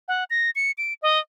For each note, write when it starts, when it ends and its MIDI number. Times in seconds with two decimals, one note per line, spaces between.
0.08 0.24 78
0.30 0.50 94
0.55 0.71 97
0.78 0.94 98
1.02 1.19 75